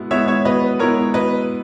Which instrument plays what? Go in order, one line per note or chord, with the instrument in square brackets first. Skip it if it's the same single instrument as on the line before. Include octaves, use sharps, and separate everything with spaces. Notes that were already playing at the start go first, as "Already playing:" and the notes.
Already playing: [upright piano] B2 G#3 B3 E4
[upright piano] G#3 B3 E4 [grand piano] C#5 E5
[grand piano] C#5 E5
[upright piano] B2 [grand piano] B4 D#5
[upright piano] G#3 B3 E4 [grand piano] A#4 C#5
[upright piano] B2 [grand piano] B4 D#5